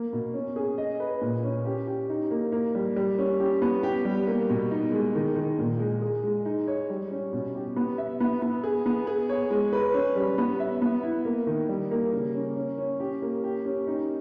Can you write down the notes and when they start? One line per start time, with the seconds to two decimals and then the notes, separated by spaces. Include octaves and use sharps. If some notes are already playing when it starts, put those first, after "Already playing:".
Already playing: A#3
0.13 B2
0.34 C#4
0.56 G#4
0.78 D#5
1.00 B4
1.21 A#2
1.44 C#4
1.65 G4
1.87 G4
2.09 D#4
2.31 A#3
2.52 A#3
2.75 G3
2.96 G3
3.18 C#4
3.40 G4
3.62 B3
3.83 G4
4.05 G3
4.27 A#3
4.49 B2
4.71 D#4
4.92 G#3
5.15 D#3
5.36 D#3
5.58 A#2
5.79 G#3
6.02 G#4
6.24 G#3
6.45 D#4
6.68 C#5
6.90 G3
7.11 C#4
7.33 B2
7.55 G4
7.76 B3
7.98 E5
8.20 B3
8.42 B3
8.64 G#4
8.86 B3
9.07 G#4
9.29 C#5
9.51 G#3
9.73 B4
9.94 C#4
10.16 G3
10.38 B3
10.60 E5
10.82 B3
11.03 E4
11.25 A#3
11.47 D#3
11.69 G3
11.91 A#3
12.13 C#3
12.35 C#4
12.56 C#4
12.78 C#4
13.00 G4
13.22 A#3
13.44 G4
13.65 C#4
13.87 D#4